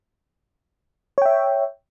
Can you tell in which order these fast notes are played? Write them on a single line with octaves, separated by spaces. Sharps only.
C#5 G5 E5